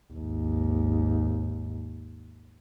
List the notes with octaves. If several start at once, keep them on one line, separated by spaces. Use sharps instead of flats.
G#1 D#2